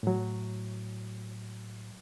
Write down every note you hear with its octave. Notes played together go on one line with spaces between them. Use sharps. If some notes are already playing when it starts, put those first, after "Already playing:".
A2 F#3